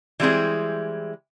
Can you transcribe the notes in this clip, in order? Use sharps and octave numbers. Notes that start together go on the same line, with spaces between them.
E3 G3 G#3 C4 E4 G#4